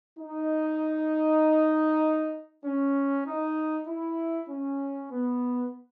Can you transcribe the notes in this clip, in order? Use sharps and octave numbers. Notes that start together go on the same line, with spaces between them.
D#4
C#4
D#4
E4
C#4
B3